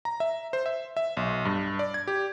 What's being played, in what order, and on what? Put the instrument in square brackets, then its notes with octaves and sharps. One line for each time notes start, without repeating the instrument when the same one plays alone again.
[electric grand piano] A#5
E5
C5
E5
E5
B1
G2
D5
G#6
G4